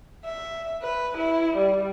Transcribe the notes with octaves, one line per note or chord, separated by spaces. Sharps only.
E5
B4
E4
G3